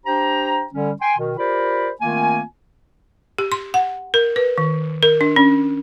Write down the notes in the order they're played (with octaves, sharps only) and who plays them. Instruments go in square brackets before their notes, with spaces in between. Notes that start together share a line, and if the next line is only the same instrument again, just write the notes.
[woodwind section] D4 G4 C5 G5 A#5
D3 G3 C#4
G5 G#5 C6
B2 D#3
F4 G4 A#4 C5 D5 B5
D#3 A3 A#3 C4 F4 G#5
[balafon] G4
C6
F#5
A#4
B4
D#3
A#4
D4
C#4